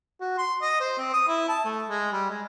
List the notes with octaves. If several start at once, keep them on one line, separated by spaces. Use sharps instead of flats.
F#4
C6
D#5
C5
C4
D#6
E4
A5
A3
G#3
G3
G#3